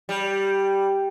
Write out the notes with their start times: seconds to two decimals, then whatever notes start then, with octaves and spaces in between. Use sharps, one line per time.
0.09 G3